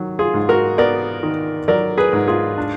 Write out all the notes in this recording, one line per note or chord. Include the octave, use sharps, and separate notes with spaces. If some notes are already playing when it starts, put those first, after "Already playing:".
Already playing: D#3 F#3
F4 G#4
G#2
F#4 A#4
B3 A#4 D5
D#3
F#3 A#4 D5
G#4 B4
G#2
F4 G#4
D4